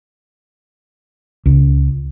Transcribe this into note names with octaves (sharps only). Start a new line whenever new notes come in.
C#2